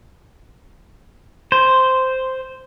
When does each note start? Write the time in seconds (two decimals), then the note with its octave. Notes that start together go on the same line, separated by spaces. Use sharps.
1.52 C5